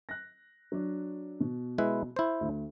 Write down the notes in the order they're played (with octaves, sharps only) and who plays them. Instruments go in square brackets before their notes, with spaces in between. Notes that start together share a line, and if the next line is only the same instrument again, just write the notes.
[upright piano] F#6 A#6
F#3 D4
B2
[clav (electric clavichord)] G#3 E4 B4
E4 C5
[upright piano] D2